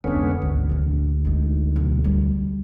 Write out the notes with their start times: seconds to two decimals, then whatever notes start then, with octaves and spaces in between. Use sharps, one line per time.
0.04 F2 D3 G#3 B3 C#4
0.42 G#1 D2
0.70 A#1 D3
1.25 G#3 D#4
1.76 B1 A#3
2.04 G3